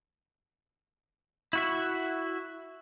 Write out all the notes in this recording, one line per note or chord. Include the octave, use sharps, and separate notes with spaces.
E4 F#4 E5